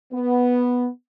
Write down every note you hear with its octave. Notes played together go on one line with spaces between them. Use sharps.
B3